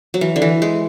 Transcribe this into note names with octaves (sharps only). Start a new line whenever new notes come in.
F#3
E3
D3
E3
G#3